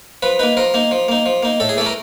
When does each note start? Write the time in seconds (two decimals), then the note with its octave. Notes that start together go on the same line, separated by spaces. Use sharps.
0.23 F3 B4
0.39 A#3 D#4 B4
0.57 F3 A#4
0.74 A#3 D#4
0.91 F3
1.08 A#3 D#4
1.26 F3
1.43 A#3 D#4
1.60 A2 A4
1.69 G#4
1.77 E3 A4
1.81 A3
1.86 A#4